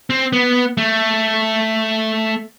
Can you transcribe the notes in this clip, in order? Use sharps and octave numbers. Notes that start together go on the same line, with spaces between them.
C4
B3
A3